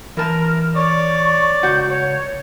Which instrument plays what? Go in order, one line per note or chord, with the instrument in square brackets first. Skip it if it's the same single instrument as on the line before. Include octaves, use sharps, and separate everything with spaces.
[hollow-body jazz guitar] E3 A5 [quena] A#4
[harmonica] C#5 D5 [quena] C#6
[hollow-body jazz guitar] C#2 F#4 F#5 [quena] G6
[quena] C#5